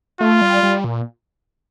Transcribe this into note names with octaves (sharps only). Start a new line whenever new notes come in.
A3 F4
G3
G3
A#2